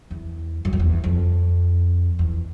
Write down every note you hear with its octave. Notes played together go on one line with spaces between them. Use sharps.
E2
F#2
F2
E2
F2
E2